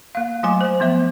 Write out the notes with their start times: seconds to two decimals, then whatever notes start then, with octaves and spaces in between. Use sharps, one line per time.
0.15 A#3 F5
0.43 F#3 A3 G#5 D6
0.61 C5 G#5
0.80 F3 B3 E5